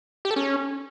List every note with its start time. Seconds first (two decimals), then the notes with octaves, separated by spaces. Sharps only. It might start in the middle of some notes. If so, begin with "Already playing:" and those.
0.25 G4
0.31 A4
0.36 C#4